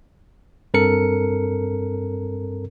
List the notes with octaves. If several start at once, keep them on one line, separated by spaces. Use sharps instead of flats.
G2 C4 A4 A#4 C#7